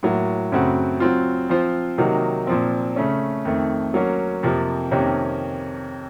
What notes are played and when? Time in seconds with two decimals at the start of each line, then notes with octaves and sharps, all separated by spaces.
0.03 A2 F#3 A#3
0.52 F#2 C#3 A3 C4 F#4
1.00 F#3 C4 F4
1.49 F3 C4 F4 C5
1.98 C3 D#3 F#3 A#3 D#4
2.47 A#2 F3 C4
2.96 C#3 A3 C#4
3.45 F2 D#3 A3
3.94 F#3 A#3 C#4
4.43 F2 C3 F3 A#3
4.91 F2 C3 D#3 A#3 C#4